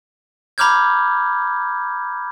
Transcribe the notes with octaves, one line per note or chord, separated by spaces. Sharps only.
A#5 B5 D6 F6 G6 G#6